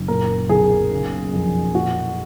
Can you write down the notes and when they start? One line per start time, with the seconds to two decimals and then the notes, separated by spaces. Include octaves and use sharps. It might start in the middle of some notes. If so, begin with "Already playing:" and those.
Already playing: F#1
0.08 A#2 A#4
0.49 B1 G#4
0.91 C#3
1.33 F2
1.74 A#2 F#4